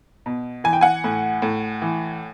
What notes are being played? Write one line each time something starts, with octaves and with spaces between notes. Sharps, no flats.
B2
E3 G#5
G5
F#5 G#5
A2
A2
E3